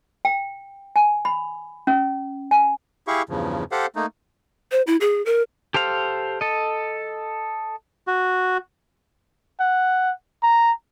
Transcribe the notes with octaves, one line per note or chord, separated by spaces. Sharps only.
G5
G#5
B5
C#4
G#5
E4 G4 G#4 F5 C#6
E2 G2 C#3 F3
G4 A4 C5 F5 F#5
A3 A#3 D#4
C5
E4
G#4
A#4
G4 A4 C5 F5
A4 D#5
F#4
F#5
A#5